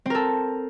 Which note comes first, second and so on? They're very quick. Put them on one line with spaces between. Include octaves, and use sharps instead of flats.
C4 A#4 A4